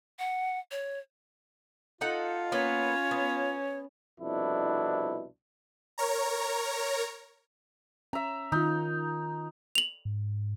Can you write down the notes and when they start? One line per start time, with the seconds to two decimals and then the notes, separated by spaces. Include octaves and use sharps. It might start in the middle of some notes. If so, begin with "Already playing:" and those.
0.19 F#5
0.71 C#5
2.01 D#4 F4 A4 F#5
2.52 A#3 B3 C#4 B4 C#5
3.11 B3
4.20 C2 F2 B2 D4 E4
5.98 A#4 C#5 A#5
8.13 C#4 E5 A#5
8.52 D#3 D#4 F4
9.75 F7 F#7
10.05 G#2